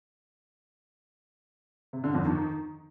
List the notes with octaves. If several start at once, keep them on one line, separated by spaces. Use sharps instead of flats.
C3
D3
F2
D#3